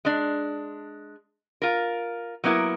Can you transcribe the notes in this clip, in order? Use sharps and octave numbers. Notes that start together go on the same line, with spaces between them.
G#3 D4
F4 A#4
F#3 A#3 B3 E4 A#4